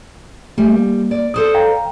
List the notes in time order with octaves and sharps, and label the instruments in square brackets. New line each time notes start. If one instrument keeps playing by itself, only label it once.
[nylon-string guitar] G3 [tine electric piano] A3
[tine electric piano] A#3
[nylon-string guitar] D5
[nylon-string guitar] A4 C5 D5 [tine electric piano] D#6
[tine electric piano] F5 G5 A#5